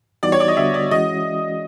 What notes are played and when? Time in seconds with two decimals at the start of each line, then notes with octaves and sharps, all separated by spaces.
0.23 E3 G3 B3 D#4 F#4 D5
0.32 C#5
0.40 D5
0.48 D#5
0.57 D3 G3 B3 D4 F#4 E5
0.74 D5
0.91 E3 G#3 C#4 F#4 D#5